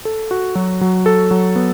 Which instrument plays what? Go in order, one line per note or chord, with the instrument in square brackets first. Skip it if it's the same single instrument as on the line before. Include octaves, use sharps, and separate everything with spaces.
[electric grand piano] A4
F#4
F#3
F#3
A4
F#3
B3